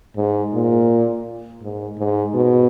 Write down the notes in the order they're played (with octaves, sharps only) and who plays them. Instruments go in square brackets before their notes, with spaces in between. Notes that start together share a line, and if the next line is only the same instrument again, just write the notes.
[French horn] G#2
A#2
G#2
G#2
B2